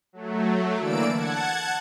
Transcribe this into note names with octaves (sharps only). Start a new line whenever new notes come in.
F#3 A3
D3 E3 A#3 D5 E6 D7
F#5 A5 G#6